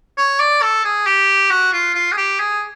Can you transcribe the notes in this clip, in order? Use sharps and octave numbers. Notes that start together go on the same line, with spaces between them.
C#5
D5
A4
G#4
G4
F#4
F4
F4
G#4
G4
G#4